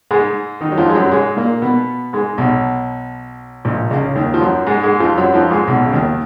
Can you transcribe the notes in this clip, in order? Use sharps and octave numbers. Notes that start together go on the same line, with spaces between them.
G#2 G#3
D#3 D#4
F#3
F2 F3
G#3
F#2 F#3
F#3
G#2 G#3
A#2 A#3
B2 B3
G#2 G#3
B1 B2
A#1 A#2
C#2 C#3
D#2 D#3
F3
F#2 F#3
G#2 G#3
G#2 G#3
F2 F3
F#2 F#3
F2 F3
G#2 G#3
B1 B2
C#3
D#2 D#3